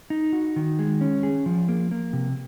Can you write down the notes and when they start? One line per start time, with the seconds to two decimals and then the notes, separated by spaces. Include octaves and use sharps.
0.10 D#4
0.33 F#4
0.56 D#3
0.79 G#3
1.01 C#4
1.23 G#4
1.46 F3
1.69 A#3
1.91 A#3
2.13 C3